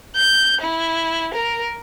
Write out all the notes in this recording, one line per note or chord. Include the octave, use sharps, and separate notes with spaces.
G6
E4
A#4